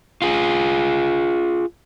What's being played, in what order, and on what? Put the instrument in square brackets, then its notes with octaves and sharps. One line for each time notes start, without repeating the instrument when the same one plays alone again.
[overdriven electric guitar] F4 G#4